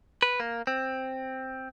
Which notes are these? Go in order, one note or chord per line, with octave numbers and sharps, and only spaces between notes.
B4
A#3
C4